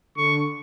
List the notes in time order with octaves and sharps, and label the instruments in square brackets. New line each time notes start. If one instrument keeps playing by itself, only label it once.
[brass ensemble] D3 [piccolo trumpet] C#6